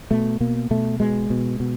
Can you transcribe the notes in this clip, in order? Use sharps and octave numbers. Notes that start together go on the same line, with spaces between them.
B2 A3
B2 A#3
B2 A3
B2 G#3
B2
B2